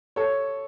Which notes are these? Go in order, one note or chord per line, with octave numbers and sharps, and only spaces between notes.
A4 C#5